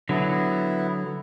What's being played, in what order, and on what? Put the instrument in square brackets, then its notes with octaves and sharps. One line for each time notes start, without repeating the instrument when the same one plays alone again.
[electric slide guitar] D3 F#3 [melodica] B3 E4